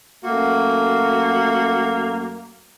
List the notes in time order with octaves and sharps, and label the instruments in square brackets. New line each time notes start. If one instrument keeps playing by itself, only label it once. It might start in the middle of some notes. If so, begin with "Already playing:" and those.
[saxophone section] F#2 A3 A#3 F#4